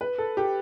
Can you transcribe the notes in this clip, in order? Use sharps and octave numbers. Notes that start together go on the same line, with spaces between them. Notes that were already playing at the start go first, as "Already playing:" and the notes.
B4
A4
G4